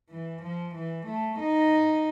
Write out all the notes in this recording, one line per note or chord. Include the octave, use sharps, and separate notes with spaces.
E3
F3
E3
A3
D#4